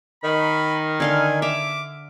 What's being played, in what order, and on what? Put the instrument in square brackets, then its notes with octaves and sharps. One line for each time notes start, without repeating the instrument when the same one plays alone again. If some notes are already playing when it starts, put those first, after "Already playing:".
[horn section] D#3 [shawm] B5
[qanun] D3 F5 C6 [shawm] G#5
[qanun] E5 F5 [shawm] D6